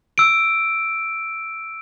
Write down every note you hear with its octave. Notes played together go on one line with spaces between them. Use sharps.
E6 D7